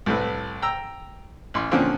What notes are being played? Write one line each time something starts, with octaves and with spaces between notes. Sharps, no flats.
C2 A2 A3 B4
G5 A#5 E6
A1 C6
A#2 D3 F3 C4 C#4 F4